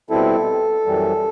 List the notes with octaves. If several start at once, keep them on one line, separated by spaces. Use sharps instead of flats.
B2 G3 C4 E4 A4
F#2 E3 G3